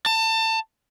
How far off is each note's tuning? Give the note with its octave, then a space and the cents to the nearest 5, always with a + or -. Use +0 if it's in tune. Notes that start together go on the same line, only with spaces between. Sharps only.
A5 +25